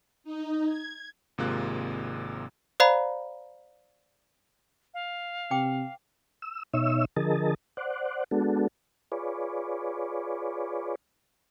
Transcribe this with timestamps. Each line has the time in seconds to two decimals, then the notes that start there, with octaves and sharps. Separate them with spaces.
0.24 D#4
0.66 G#6
1.38 G#1 C3 G#3 A#3 F4 F#6
2.80 C5 D5 F5 A#5 B5
4.94 F5
5.51 C3 B4 G5 D6
6.42 E6
6.74 B2 D#4 C#5 E5 E6
7.17 D3 F3 G#4 A#4 D#5 A5
7.77 C5 D5 F#5
8.31 G#3 B3 D4 F#4 A4
9.12 F4 G#4 B4 C#5 D5